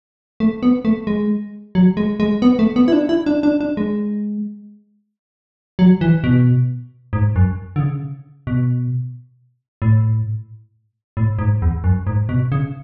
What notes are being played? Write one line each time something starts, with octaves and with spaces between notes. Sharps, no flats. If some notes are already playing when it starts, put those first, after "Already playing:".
A3
B3
A3
G#3
F#3
G#3
G#3
B3
A3
B3
E4
D4
E4
D4
D4
D4
G#3
F#3
E3
B2
G#2
F#2
D3
C#3
B2
A2
A2
G#2
E2
F#2
G#2
B2
C#3